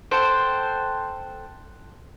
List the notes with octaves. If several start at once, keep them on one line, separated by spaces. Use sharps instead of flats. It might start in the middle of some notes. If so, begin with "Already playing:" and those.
A4 C5 F#5 G5